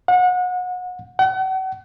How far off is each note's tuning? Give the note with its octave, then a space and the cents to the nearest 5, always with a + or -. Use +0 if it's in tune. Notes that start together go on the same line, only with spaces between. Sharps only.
F#5 -30
F#5 +40